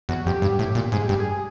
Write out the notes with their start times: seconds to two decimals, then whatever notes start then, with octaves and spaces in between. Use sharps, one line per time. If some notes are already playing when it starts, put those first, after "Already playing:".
0.09 E2 F#4
0.26 F2 G4
0.42 G2
0.59 A2
0.75 A#2
0.92 G#2 G#4
1.06 G2 G4
1.20 G#4
1.31 G#4